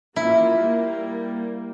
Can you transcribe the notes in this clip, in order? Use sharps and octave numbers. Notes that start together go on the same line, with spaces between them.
A#3 E4 F4
G3 A#3